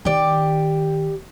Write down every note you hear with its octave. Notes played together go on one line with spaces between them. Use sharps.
D#3 G4 D5